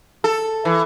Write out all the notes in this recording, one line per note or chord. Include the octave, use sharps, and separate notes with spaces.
A4
E3